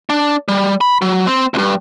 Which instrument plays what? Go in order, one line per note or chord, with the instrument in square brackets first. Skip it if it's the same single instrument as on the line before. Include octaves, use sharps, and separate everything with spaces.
[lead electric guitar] D4
G3
B5
F#3
C4
C2 G2